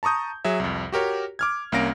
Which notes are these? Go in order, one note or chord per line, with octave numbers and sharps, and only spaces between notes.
A5 A#5 C#6 D#6 G6
F#3 G#4 E5
C2 F2
F#4 G4 A#4 C#5
D6 F6 G#6
C2 A#3 C#4 F5 A#6 D7